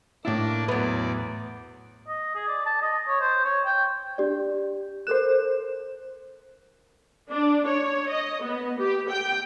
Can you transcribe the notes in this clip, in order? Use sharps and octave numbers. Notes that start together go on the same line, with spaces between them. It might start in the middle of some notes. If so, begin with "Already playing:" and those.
A2 A#3 D4 E4 D5
E2 F#3 B3 D5
D#5
G#4
D5
A5
D#5
C#5
C5
C#5
G5
D4 G4 D5
A4 A#4 C5 F#6 E7
D4
C#5
D#5
B3
G4
G5